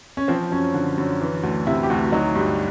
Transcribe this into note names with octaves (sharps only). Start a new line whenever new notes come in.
C#4
F3 C4
F#2 C#4
D3
F#2
E3
D2
C3 E4
G4
D2 F#4
F#3 D#4
G2